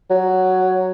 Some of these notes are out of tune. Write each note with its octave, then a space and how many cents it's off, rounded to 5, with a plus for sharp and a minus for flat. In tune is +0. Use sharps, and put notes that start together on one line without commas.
F#3 +5